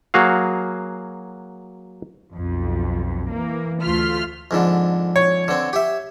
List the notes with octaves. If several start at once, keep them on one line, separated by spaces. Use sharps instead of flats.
F#3 A#3 F#4 G#4 F5
B1 F2
E3 A#3
D2 A3 F4 C6 F6 B6
F2 G#2 D3
C#5
D3 C4
G4 E5